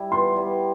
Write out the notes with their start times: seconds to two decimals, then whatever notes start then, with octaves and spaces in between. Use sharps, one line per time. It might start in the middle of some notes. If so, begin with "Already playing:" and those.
Already playing: G3 E4
0.12 B3 C6
0.36 G3